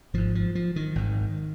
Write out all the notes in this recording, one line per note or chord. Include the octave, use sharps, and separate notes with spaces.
G#1 G#2 F3
F3
F3
D#3
G#1 G#2